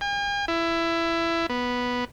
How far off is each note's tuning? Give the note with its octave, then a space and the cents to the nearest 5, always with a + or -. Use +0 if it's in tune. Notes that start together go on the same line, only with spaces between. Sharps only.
G#5 -45
E4 +20
B3 -5